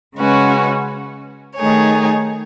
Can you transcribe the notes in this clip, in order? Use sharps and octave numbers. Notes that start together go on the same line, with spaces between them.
C#3 G#3 C#4 F#4 B4
D#3 A3 D#4 G#4 C#5